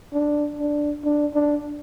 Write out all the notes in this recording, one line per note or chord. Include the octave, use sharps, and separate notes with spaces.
D4
D4
D4
D4